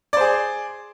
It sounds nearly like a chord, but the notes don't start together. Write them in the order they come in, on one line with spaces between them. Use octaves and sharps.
D5 C5 G#4